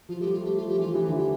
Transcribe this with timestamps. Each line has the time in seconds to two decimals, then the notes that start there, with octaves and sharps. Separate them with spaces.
0.09 F3 F4
0.20 A3 G4
0.26 G3
0.33 F4
0.43 A3 G4
0.57 F3 F4
0.68 G4
0.78 E3 F4
0.92 E3 G4
1.04 D3 F4
1.12 E3
1.16 G4